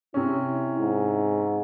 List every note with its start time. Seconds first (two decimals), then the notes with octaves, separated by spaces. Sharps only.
0.14 C3 C#4 E4
0.80 G#2